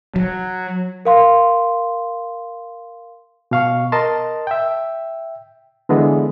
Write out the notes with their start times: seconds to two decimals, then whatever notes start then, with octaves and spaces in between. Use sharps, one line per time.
0.16 F#3
1.05 A#4 F5 C6
3.51 B2 F5 C#6
3.92 A#4 D#5 A5 C6
4.47 E5 G5
5.89 D3 E3 G#3 B3